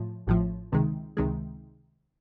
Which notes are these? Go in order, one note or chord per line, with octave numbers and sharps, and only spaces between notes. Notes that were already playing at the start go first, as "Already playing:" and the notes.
Already playing: A2 F3
A1 A2 F3
C#2 C3 D#3 G#3
C#2 C3 D#3 G#3